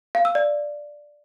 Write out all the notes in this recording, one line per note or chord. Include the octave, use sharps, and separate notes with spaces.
F5
E6
D5